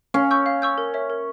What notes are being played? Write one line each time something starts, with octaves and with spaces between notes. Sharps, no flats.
C#4 F5
C#6 E6 G6
F5
C#6 E6 G6
A#4
C#5 E5
A#4